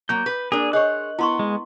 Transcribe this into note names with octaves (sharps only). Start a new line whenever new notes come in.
F#3 A#3 G6
B4
A#3 D4 G#4 A#4
G#4 C5 C#5 D#5 F#6
B3 E4 C6 C#6
G#3